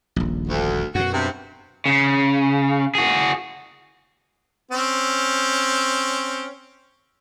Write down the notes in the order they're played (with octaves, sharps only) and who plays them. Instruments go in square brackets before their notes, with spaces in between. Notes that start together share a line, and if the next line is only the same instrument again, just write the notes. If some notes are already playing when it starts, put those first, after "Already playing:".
[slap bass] D#1 A#1
[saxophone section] D2
[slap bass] F#2 B2 [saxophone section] F#4
[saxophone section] G2 C3
[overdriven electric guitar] C#3
F#4 G#4
[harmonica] C4 C#4